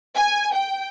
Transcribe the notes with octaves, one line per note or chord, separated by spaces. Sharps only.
G#5
G5